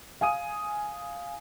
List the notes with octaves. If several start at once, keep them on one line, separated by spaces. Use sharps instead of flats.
F5 G#5 D#6 D#7